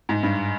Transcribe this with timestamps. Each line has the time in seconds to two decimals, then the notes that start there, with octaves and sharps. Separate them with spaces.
0.09 G#2
0.23 G2